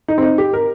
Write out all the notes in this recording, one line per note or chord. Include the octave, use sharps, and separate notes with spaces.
D#4
C4
D#4
G4
A#4